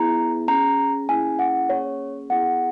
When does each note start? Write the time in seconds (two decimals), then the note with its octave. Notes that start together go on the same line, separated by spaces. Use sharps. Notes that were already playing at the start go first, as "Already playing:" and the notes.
Already playing: B3 E4 G#4 A#5
0.48 C#4 G#4 A#5
1.08 A#3 C#4 E4 G#4 G#5
1.39 F#5
1.69 A#3 C#4 G#4 C#5
2.30 B3 E4 G#4 F#5